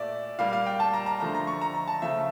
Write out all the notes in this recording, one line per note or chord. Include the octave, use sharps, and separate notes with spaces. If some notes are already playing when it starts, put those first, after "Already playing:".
Already playing: A#2 A3 D5 E5
A#2 G3 A#3 F5
F5
G5
A5
A#5
A#5
D3 F3 A3 A#5
A#5
C#6
A#5
A#5
A5
C#3 F3 A3 E5